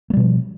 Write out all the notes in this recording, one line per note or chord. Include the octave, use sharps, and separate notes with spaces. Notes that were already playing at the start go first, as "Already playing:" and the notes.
B2 F3 G3 A#3